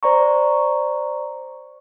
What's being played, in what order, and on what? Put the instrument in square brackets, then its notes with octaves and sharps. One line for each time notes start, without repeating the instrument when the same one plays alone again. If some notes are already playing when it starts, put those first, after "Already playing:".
[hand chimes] C5 D5 A#5 C#6